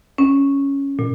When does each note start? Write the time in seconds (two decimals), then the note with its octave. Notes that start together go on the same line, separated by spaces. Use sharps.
0.18 C#4
0.99 A#2